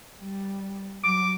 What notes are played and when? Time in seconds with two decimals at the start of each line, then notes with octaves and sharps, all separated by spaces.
0.21 G3
1.04 F#3 D6